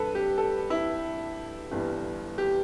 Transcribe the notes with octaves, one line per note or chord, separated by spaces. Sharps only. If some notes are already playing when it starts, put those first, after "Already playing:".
Already playing: G2 D4 A4 B4
G4
A4
E4
G1 G2 E3 G3
G4